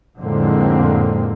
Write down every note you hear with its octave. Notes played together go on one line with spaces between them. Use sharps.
F2 A2 D3 G#3 A#3 C4